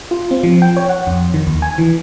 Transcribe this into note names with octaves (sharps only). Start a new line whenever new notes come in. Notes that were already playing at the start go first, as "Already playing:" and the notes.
F4
C4
F3
G5
C#5
F#5
F2
D#3
D#2
G#5
E3